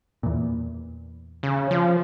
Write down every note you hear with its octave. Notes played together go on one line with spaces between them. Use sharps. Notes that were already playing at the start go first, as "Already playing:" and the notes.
E2 A#2
C#3
F3